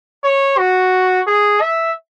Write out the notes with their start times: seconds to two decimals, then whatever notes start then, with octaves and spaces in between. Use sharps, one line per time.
0.24 C#5
0.58 F#4
1.27 G#4
1.61 E5